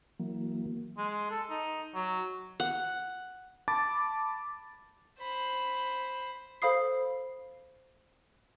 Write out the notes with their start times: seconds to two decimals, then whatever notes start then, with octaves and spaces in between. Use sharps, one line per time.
0.19 E3 F#3 A#3
0.98 G#3
1.31 A4
1.50 D#4
1.95 F#3
2.60 F#5
3.68 A5 B5 D6 A6
5.19 C5 B5
6.62 A4 C5 F5 B5 D#6 C7